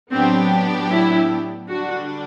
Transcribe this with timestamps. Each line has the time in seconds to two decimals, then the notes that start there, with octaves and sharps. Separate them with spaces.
0.11 A2 F#3 B3 C4 D4 G4
0.90 E4
1.69 D3 G3 D4 F#4